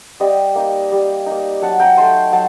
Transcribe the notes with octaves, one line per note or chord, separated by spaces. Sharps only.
G3 D#5 G5
A#3 D#4
G3
A#3 D#4
F#3 F#5 A5
G5 A#5
A3 D#4 A5 C6
F#3 F#5 A5